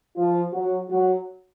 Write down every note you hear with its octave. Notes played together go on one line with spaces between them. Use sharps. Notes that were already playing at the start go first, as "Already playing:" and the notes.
F3 F4
F#3 F#4
F#3 F#4